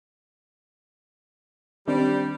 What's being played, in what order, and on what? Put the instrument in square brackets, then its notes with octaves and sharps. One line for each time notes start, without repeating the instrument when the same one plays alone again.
[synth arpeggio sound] D#3 C4 D4 [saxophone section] G3